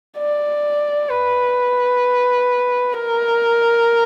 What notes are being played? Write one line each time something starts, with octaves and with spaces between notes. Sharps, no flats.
D5
B4
A#4